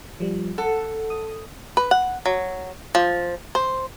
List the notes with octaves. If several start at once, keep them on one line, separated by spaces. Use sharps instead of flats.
F3 G3
A4 F#5
D#6
B4
F#5
F#3
F3
C5